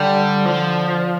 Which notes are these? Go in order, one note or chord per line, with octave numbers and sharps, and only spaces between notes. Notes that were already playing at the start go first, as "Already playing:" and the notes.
Already playing: D3 G3
F3